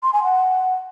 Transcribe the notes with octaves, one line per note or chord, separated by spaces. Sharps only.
C6
G#5
F#5